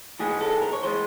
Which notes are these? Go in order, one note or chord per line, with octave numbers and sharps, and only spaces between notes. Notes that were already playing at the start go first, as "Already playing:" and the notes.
G#2 E3 G#3 G#4
A4
A#4
C#5
E3 G#3 C5